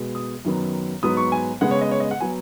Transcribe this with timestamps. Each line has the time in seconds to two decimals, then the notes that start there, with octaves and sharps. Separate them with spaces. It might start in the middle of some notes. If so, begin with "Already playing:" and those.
Already playing: B2 G#3 B3
0.15 D#6
0.45 F#2 D#3 F#3 B3
1.03 G#2 F#3 B3 D#6
1.17 C#6
1.32 G#5
1.61 C#3 G#3 B3 F#5
1.71 C#5
1.81 D#5
1.91 C#5
2.00 D#5
2.11 F#5
2.20 F#3 B3 G#5